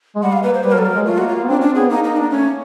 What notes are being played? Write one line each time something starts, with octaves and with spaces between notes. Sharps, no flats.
G#3
G3 F#5
F5
A#3 B4
C5
G3 B4
A#4
F#3
A4
F#3 A#4
G#3
A3 F4
A#3 F#4
F4
A#3
B3
C4 D4
C#4
D4
C4
B3 G#4
A#3 D#4
D#4
D4
A3 C#4